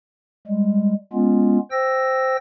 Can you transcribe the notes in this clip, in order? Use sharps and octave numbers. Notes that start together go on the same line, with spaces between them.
G3 G#3
G#3 B3 C#4 F4
C5 G5 E6 A#6